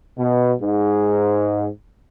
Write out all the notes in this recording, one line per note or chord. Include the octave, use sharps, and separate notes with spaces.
B2
G#2